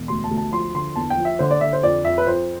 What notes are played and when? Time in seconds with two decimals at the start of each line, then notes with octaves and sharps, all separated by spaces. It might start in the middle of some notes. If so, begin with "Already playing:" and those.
Already playing: E1
0.08 D2 C6
0.24 A5
0.31 D2
0.37 A5
0.52 F3 C6
0.75 D3 C6
0.96 E2 A5
1.10 G5
1.17 F3
1.25 E5
1.39 D3 C5
1.51 D5
1.61 D3 E5
1.73 C5
1.83 F2 D5
2.05 F2 E5
2.18 B4
2.27 F2 C5